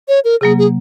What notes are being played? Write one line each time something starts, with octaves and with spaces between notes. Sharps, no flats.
C#5
A#4
C3 F#3 A#3 G#4
G#4